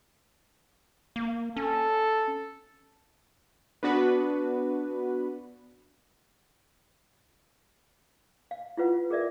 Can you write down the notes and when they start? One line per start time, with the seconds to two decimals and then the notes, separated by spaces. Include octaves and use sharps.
1.16 A#3
1.57 C#4 A4
3.83 B3 D4 F#4 B4
8.51 F5
8.77 E4 F4 B4 F#5
9.10 G#4 A#4 D5 E5